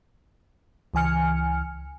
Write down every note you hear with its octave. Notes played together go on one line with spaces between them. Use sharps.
C#2 E3 G#5 F6 C#7